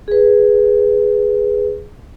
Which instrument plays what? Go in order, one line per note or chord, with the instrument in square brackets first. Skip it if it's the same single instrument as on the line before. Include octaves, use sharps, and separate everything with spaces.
[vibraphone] G#4 B4